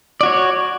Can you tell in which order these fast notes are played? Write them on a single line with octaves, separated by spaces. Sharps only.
D5 F#4 C#5